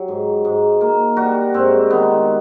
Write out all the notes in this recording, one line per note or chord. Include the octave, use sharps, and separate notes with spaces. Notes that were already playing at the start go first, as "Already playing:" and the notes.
Already playing: F#3 G4
G#2
G#2
A#3
G3 F#4
G#2 C4
D#3 B3